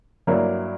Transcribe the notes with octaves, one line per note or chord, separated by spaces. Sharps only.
G2 F#3 A#3 E4 A#4